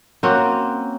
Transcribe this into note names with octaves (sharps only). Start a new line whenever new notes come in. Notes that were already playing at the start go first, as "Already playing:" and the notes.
A#3 C4 C#4 F#4